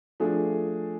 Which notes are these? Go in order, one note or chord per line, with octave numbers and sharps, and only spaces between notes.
F3 A3 D4 G#4